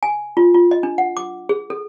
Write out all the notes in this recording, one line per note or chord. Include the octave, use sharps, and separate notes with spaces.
G#5
F4
F4
D#5
D4
F#5
D6
G#4
A4